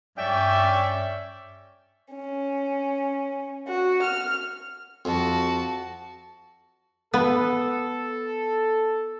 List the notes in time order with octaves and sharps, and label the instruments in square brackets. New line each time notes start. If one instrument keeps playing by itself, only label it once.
[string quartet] G2 C#6 G6 [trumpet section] C#4 D5 E5 [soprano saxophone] G5
[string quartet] C#4
F#4
F6
[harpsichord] F2 [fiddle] F#4 A5
[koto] B3 [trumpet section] A4